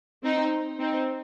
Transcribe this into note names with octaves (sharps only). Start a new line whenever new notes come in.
C4 D#4
C4 D#4